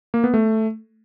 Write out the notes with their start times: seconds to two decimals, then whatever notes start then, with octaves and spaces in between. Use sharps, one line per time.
0.14 A#3
0.24 B3
0.34 A3